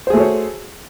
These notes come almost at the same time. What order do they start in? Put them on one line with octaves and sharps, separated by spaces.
C5 G#4 A3 F#4 C#5